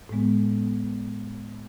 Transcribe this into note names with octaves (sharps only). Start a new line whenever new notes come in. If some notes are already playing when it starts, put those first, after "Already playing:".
A2 G#3 B3